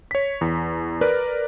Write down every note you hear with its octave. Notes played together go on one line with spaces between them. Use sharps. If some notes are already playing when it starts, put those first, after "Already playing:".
C#5 B6
E2
A#4 B4 D5